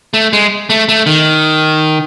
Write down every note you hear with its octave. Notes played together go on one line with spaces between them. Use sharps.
A3
G#3
A3
A3
D#3